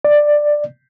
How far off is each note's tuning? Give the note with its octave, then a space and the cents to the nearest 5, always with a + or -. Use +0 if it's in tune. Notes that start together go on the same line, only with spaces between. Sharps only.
D5 +10